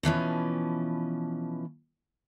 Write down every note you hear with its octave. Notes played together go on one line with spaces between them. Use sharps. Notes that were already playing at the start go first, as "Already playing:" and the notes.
B2 E3 F3 C#4